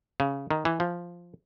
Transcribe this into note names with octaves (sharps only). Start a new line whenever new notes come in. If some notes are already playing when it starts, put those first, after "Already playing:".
C#3
D#3
E3
F3